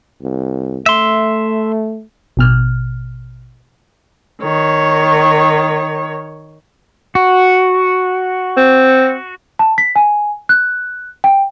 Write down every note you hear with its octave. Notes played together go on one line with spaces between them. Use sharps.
C2
A3 E5 C6
A1 B2 F6
D#3 C#5
F#4
C4
A5
B6
G#5
F#6
G5